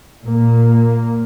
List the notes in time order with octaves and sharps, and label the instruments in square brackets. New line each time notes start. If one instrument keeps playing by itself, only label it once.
[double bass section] A#2 A#3